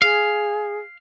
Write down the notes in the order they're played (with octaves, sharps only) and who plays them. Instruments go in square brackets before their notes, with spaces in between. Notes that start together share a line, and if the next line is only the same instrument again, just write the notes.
[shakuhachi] G#4 [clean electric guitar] F5